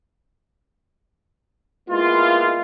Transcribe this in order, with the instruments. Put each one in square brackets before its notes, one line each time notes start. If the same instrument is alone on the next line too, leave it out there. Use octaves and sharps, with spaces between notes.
[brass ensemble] G#3 A#3 B3 E4 F4